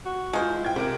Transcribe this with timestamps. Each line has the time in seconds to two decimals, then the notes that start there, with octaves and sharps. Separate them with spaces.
0.06 F#4
0.33 G#3 F4 C5
0.49 E4
0.65 G5 G#6
0.76 C3 C4 A#4 D7